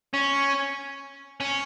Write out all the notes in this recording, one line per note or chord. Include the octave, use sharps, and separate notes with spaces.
C#4
C#4